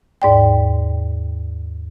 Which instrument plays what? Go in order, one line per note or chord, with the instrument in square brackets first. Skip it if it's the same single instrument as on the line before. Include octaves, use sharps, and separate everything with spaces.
[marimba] D#2 G#2 D5 G5